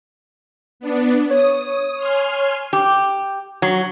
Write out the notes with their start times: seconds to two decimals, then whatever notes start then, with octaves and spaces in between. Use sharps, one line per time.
0.80 B3 D4
1.30 C#5 D#6
1.97 G#5 C6 F6
2.73 G4
3.62 F#3